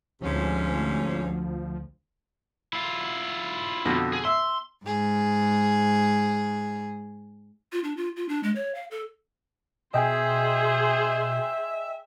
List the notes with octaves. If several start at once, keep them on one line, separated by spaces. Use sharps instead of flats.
D2 G#2 C3 F3 C#4
E4 F4
F2 B2 D3
G#4
E5 C6
G#2 G#4
F4
D4
F4
F4
D4
G#3
C#5
F5
A4
B2 G#4 C5 D#5 E5 G5 G#5